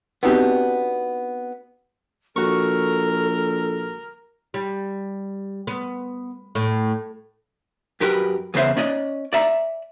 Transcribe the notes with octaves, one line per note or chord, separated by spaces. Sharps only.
B3 C4 D4 D#4 F#4 G4
A#1 F#4 A4 A#4 C#6
G3
B3
A2
F#2 G4 A#4 B4 B5
E2 C#3 B4 C5 E5
C#4 D5 D#5
D5 E5 A#5